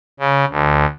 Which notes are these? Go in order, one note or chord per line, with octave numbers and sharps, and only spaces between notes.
C#3
D2